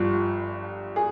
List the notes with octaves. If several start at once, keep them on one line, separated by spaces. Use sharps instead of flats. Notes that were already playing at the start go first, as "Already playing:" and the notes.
Already playing: G1 G2 F3
G#4